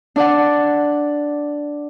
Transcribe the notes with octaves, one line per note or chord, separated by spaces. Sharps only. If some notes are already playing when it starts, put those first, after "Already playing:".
D4 D5 F#5